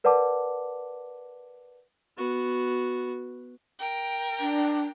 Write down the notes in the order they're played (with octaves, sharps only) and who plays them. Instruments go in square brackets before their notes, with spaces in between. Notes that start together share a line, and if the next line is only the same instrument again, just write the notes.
[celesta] A#4 B4 D5 F#5 A5 D6
[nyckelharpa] B3 F#4
[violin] A#4 G5
[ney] D4